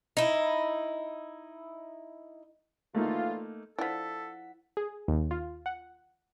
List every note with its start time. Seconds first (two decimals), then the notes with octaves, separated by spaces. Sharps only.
0.17 D#4 E4
2.95 D3 E3 A3 A#3 D#4 F4
3.79 F3 D4 E4 A4 F#5 B6
4.77 G#4
5.08 D#2
5.31 F4
5.66 F#5